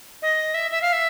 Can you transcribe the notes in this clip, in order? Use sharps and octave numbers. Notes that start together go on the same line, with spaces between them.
D#5
E5
E5
F5
E5